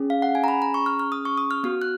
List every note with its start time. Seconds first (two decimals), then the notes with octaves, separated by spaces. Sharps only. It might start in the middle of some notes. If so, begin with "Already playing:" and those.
Already playing: C#4 G#4
0.10 F5
0.22 F#5
0.35 G#5
0.44 A#5
0.48 B5
0.62 A#5
0.74 C#6
0.86 F6
1.00 F6
1.12 D#6
1.25 C#6
1.37 D#6
1.51 F6
1.64 B3 F#4 F6
1.82 F#6